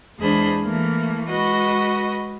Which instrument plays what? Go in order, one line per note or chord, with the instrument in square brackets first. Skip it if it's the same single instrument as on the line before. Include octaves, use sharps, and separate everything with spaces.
[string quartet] E2 G#3 D4 G#4 C5 B5
E3 A3 A#3
G#3 F#4 B4 D#5